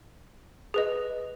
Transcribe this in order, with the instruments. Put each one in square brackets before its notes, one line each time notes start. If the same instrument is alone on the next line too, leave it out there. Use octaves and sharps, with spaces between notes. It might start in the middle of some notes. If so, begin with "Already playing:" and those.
[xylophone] G#4 B4 D#5